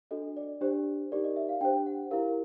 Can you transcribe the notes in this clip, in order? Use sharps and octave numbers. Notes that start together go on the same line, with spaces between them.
D4 F#4 A4 D#5
D5
D4 G4 C5
D#4 G4 A#4 D5
D#5
E5
F5
D4 G4 C5 G5
F#5
E4 G4 A#4 F5